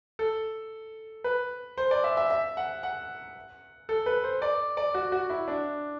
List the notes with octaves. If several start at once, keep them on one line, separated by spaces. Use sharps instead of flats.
A4
B4
C5
D5
E5
E5
E5
F#5
F#5
A4
B4
C5
D5
D5
F#4
F#4
E4
D4